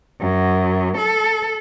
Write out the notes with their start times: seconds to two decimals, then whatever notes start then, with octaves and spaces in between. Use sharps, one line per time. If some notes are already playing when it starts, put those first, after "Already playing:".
0.21 F#2
0.97 A4